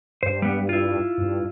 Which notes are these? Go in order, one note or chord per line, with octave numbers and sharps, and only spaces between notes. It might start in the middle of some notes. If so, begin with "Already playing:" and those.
G2 C5
G3 B3
E4 F4
G2